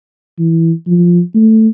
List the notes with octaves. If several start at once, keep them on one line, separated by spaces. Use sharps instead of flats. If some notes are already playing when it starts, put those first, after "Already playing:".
E3
F3
A3